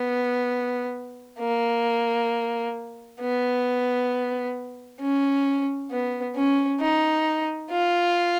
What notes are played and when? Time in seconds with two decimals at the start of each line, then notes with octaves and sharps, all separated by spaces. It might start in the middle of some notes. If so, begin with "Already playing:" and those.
Already playing: B3
1.39 A#3
3.20 B3
5.00 C#4
5.91 B3
6.36 C#4
6.81 D#4
7.71 F4